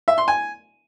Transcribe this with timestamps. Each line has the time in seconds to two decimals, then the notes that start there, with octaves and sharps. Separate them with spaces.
0.08 E5
0.18 C6
0.28 G#5